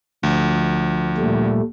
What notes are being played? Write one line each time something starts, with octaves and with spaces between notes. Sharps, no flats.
D2 F3
A#2 G3 A3